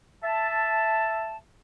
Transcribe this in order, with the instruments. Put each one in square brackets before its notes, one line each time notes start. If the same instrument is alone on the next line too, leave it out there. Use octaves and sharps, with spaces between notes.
[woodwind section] E5 A5